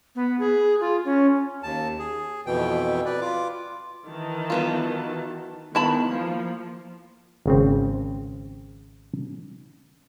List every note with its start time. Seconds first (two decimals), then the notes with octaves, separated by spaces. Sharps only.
0.15 B3
0.39 G#4
0.81 F4
1.05 C#4
1.63 D#2 A5
1.99 G#4
2.46 F2 B2 E3 G5
3.05 B4 D5
3.21 F4 D6
4.06 D#3 E3 A5
4.50 F#3 B3 F4
5.75 D#3 B3 E4 A5 B5
6.08 F3 A#3
7.46 G#1 C#3 C4